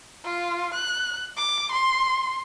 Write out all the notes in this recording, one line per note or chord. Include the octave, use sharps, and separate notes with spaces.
F4
F#6
D6
C6